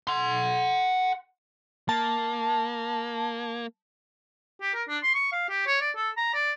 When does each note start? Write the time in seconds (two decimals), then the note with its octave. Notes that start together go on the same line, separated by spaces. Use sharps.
0.07 F#5 C6
1.89 A#3 A5
4.62 G4
4.74 A#4
4.88 D4
5.03 C6
5.15 C#6
5.33 F5
5.50 G4
5.67 C#5
5.81 D5
5.97 A4
6.17 A#5
6.34 D5